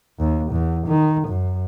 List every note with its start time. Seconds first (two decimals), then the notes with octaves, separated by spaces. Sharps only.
0.19 D#2
0.52 E2
0.87 D#3
1.28 F#2